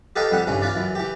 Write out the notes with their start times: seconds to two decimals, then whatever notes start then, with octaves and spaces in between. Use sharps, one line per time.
0.16 G4 A4 B4 D#5 F5 G5
0.31 F2 G3 G4 F#5
0.47 C2 G2 E3 C#4
0.62 F4 B4 D5
0.75 F#2 E3
0.95 E3 G4